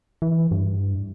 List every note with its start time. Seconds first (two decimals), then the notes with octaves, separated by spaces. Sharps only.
0.22 E3
0.51 G2